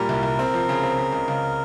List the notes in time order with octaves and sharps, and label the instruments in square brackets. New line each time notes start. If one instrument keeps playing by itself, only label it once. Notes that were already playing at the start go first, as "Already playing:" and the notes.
Already playing: [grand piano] A#2 G3 [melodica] A#4
[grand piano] C2
C2
C4
F3
C#3
C4
C#3
C#2
C#2